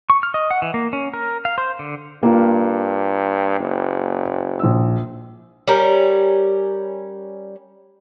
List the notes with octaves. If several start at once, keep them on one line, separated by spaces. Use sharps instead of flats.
C#6
F6
D#5
F#5
E3
A#3
C#4
A#4
F5
C5
D3
G2 A#3 F4
F#1
A#1 E6
G3 C#4 A#4